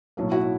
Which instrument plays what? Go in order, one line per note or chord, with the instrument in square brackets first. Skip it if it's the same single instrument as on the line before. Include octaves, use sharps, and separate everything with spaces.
[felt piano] B1 A2 F#3 A#3
E4 F#4